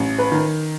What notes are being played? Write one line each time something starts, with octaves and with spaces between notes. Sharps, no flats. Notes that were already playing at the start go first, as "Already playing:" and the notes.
Already playing: A1
B4
D#3